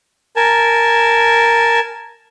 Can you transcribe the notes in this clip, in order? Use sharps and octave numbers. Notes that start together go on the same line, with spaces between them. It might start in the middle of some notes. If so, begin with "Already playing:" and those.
A#4 G#5 A5